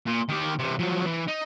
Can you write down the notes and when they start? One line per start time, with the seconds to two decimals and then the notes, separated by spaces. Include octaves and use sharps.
0.06 A#2
0.29 D#3 G4
0.59 C3 E3
0.79 F3 F#3
1.05 E3
1.27 D#4